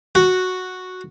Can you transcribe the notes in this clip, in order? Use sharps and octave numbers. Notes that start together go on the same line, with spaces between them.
F#4